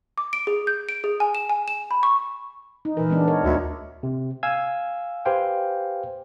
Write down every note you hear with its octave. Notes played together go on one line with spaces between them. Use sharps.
D6
D7
G#4
G6
D7
G#4
G#5
E7
G#5
E7
B5
C#6
D#4
A#2 E3 A#4
G#3 B3 D4
A#4 C#5
D2 D4
C3
F5 G#5 E6 G#6
G4 B4 C5 F5 G5 G#5